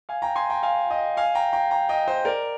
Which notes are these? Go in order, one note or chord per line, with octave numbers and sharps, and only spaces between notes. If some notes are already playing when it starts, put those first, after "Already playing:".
F5 G#5
G5 A#5
G#5 C6
G5 A#5
F5 G#5
D#5 G5
F5 G#5
G5 A#5
G5 A#5
G5 A#5
D#5 G5
C5 D#5
A#4 D5